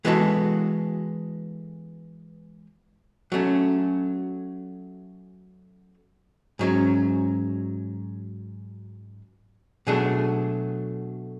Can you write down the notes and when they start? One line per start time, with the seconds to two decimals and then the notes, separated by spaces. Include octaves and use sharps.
0.05 E3 G#3 B3 F#4 A4
3.32 F#3 A3 C#4
6.59 G#2 F#3 C#4
9.87 B2 F#3 A3 D4 G#4